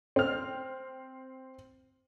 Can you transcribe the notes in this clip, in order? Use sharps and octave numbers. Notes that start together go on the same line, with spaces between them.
C4 F6